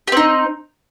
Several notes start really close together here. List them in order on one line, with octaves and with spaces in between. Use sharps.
G4 C4 D#4